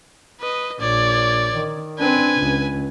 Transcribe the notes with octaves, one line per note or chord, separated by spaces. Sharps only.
B4 D#5
A#1 C#5 D5
D#3
C4 D4 B4 G#5
C#2